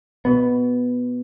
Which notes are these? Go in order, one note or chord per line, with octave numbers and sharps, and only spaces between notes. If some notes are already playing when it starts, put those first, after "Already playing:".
B2 B3